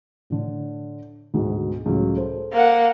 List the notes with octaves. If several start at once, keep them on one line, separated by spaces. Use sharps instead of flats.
A2 D3
D2 G#2 B2
C#2 A2 F#3
A4 C5
A#3 F#5